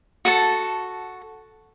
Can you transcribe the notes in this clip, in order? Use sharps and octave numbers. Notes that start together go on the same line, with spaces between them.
F#4 A4 A5